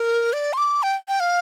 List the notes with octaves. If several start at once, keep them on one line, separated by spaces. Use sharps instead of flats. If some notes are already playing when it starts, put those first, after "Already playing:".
Already playing: A#4
D5
C6
D6
G5
G5
F5